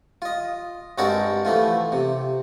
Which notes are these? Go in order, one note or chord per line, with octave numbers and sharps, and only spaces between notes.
F4 D#5
G2 G#3 C4 F#4 A#4 A5
E3 F3 A3 F4
C3